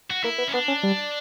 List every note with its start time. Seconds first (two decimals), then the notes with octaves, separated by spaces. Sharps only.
0.10 F#4
0.24 A#3 E4
0.38 B3
0.48 C#4
0.54 B3 D4
0.68 C#4
0.83 G3